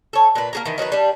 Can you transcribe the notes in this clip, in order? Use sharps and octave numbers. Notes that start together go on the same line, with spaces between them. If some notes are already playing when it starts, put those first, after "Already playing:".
A4 C#5
A#2 B4
A#3 G#4 A#5
D#3 E3
D#3 F#3 D#4 B4
G3 D4